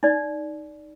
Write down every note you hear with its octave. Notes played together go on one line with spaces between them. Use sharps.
D#4 D5